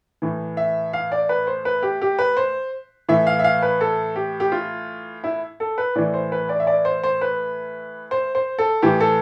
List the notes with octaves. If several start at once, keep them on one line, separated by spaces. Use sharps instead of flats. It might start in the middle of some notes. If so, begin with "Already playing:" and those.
A2 E3
E5
F5
D5
B4
C5
B4
G4
G4
B4
C5
A2 E3 E5
F5
E5
F5
B4
A4
G4
G4
F4
E4
A4
B4
A2 E3 D5
C5
B4
D5
E5
D5
C5
C5
B4
C5
C5
A4
A2 E3 G4
A4